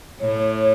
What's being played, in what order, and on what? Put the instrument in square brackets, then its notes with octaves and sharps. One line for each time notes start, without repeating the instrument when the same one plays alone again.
[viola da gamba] A2 [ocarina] C#5